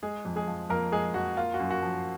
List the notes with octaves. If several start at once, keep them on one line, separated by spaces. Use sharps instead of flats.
G#3 G#4
F2
G#3 G#4
F3
F2 A#3 A#4
G#3 G#4
F2 F#4
A#3 F4
F#4
F#2
F#4
F3